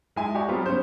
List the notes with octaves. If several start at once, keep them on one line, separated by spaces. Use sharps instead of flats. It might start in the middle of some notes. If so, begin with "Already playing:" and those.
G#3 E4 G#5 A5
F#4 G4 D5 D#5 G#5 C#6
F#3 G3 B3 C4 F4 G#4
B3 C#4 C5